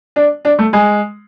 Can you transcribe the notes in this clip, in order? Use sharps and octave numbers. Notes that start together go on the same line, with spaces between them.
D4
D4
A3
G#3